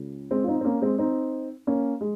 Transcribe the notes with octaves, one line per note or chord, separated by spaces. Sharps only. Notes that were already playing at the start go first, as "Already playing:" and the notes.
Already playing: C#2 C#3
G#3 C4
F4
C4 D#4
C4
A#3 C#4
G#3 C4
C4 D#4
A#3 C#4
G#3